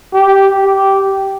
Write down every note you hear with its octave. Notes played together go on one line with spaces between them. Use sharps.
G4
G4